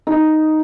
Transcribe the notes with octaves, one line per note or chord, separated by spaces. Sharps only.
D#4